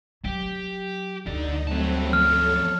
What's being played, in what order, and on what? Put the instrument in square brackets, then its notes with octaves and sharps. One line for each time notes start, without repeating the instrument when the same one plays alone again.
[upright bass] F#3 [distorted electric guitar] G4
[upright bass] D2 [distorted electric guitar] D3 D5 [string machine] D#4
[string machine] F#3 A3 C4 [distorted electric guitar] G3 A5
[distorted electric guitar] F3 B3 [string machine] A4 C#5 [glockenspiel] F6